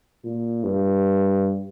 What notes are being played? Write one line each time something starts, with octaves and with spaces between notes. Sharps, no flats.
A#2
G2